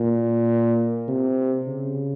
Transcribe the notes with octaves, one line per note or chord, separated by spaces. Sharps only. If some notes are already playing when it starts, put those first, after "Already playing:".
Already playing: A#2
C3
C#3